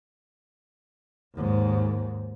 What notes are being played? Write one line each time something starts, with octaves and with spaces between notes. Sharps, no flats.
D#2 G#2